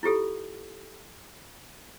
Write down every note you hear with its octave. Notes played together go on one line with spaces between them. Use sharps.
E4 F4 G4 A4